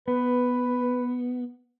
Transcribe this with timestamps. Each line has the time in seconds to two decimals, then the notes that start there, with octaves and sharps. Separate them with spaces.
0.08 B3 B4